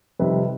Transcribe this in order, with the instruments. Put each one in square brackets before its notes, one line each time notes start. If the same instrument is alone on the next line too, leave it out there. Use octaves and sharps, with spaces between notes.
[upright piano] F2 C3 D#3 G3 B4